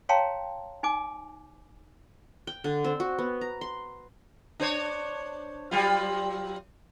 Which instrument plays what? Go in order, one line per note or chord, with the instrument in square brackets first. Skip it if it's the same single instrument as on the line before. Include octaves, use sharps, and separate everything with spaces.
[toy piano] C#5 F5 G5 A5 A#5 C6
D#4 G#5 D6
[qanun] G5
D3
C4
F#4
B3
A#5
C6
[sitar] D4 C5 C#5
F#3 G3 F4